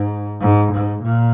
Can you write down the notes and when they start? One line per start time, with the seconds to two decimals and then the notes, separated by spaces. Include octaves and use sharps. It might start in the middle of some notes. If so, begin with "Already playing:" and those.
Already playing: G#2
0.41 G#2
0.72 G#2
1.02 A#2